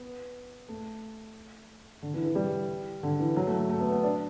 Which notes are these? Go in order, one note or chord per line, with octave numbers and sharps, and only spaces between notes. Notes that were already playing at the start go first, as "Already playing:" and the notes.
Already playing: B3
A3
D3
E3
E3
G3
D3
E3
F#3
A3
A3
A3
B3
B3
D4